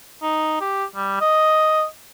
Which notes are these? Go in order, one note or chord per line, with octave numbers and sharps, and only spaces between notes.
D#4
G4
G3
D#5